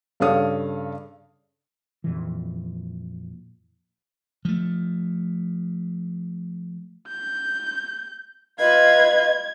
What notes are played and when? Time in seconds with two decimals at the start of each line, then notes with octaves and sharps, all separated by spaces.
0.20 G2 C#3 A4 C#5 F5 D#6
2.04 F2 A#2 E3
4.45 F3 A3
7.08 G6
8.59 F4 B4 D#5 G#6